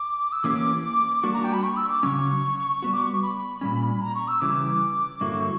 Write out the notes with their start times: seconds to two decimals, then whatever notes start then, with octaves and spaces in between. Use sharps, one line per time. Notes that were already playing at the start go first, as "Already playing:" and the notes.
Already playing: D6
0.32 E6
0.44 E3 A#3 C#4 G4 D6
1.24 G3 A#3 D4 F#4 C#6
1.34 A#5
1.44 G5
1.53 B5
1.64 C#6
1.77 E6
1.89 D6
2.03 C#3 F#3 C#4 C#6
2.82 G3 B3 F#4
2.93 D6
3.02 C#6
3.13 C#6
3.23 B5
3.61 A#2 G3 C#4
4.02 A#5
4.15 C#6
4.28 E6
4.41 C#3 E3 G3 D6
5.21 G2 D3 F#3 A#3 E4 C#6